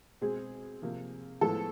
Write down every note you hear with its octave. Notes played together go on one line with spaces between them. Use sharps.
B2 G#3 C4 G#4
C3 F3 A#3
A2 F3 G#3 B3 A4